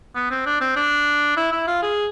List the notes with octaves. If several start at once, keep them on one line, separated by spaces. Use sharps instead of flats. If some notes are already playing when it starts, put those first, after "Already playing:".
B3
C4
D4
C4
D4
E4
E4
F4
G#4